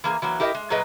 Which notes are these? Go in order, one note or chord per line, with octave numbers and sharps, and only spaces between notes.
E3 A#3 G#4
E3 F#3 A#3
E4 G4 A#4 D#5 E5
G#3
A#2 F#3 G#4 B4 D#5